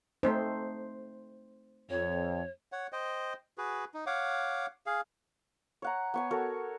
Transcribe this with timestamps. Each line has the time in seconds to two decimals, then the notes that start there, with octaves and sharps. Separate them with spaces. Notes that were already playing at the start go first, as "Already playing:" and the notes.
0.23 A3 C4 D#4 C5
1.90 F2 C#5
2.72 C#5 F#5
2.92 C5 D#5 G5
3.58 F#4 G#4 B4
3.94 D#4
4.06 C#5 F5 F#5 D6
4.86 G#4 F5
5.82 C#5 F#5 A#5
6.14 B3 C#5 G#5
6.31 F#4 A4 A#4 C#5